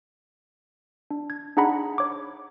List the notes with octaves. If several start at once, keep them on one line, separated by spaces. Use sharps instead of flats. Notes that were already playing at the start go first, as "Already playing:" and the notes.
D4
G#6
D4 D#4 G#4 F#5 A#5 B5
C#5 D6